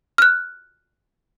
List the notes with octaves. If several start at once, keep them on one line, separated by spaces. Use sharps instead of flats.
F6 F#6